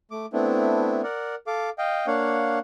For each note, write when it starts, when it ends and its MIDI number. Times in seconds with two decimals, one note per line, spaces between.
0.11 0.26 57
0.11 0.26 86
0.33 1.02 57
0.33 1.02 59
0.33 1.02 60
0.33 1.02 62
0.33 1.02 64
1.03 1.35 70
1.03 1.35 74
1.03 1.35 78
1.47 1.70 69
1.47 1.70 77
1.47 1.70 86
1.78 2.06 75
1.78 2.06 77
1.78 2.06 79
2.07 2.59 58
2.07 2.59 62
2.07 2.59 73
2.07 2.59 77
2.07 2.59 78